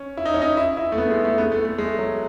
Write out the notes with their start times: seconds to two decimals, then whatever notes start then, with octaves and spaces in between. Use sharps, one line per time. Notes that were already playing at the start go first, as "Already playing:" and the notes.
Already playing: C#4
0.17 E4
0.25 D#4
0.34 C#4
0.42 D#4
0.57 E4
0.77 E4
0.92 A3
0.98 B3
1.11 G#3
1.25 A3
1.38 B3
1.52 A3
1.65 A3
1.78 G#3
1.98 F#3